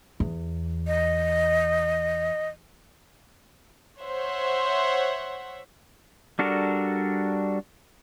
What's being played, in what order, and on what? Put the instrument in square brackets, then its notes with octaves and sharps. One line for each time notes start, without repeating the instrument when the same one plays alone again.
[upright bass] E2
[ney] D#5
[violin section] C5 C#5 E5 F#5
[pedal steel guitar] G3 D4 F#4 A4 A#4